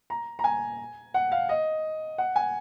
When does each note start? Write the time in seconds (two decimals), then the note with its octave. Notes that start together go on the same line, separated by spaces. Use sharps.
0.10 A#5
0.39 A#5
0.44 G#5
1.14 F#5
1.32 F5
1.49 D#5
2.18 F#5
2.36 G#5